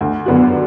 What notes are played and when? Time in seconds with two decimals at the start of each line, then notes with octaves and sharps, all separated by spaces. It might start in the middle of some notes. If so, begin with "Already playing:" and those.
0.01 D2
0.26 D3 F#3 B3 F#4